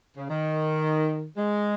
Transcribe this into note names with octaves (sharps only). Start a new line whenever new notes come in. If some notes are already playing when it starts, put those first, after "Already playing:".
C#3
D#3
G#3